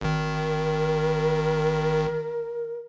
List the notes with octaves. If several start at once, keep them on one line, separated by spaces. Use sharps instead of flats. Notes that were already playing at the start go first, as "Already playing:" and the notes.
G#1 D#3 A#4